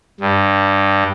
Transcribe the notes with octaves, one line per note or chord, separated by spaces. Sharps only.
G2